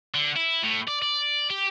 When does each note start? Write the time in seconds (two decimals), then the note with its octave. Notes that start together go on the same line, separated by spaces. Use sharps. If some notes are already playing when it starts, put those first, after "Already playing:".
0.14 D3
0.36 E4
0.64 A2
0.88 D5
1.02 D5
1.50 G4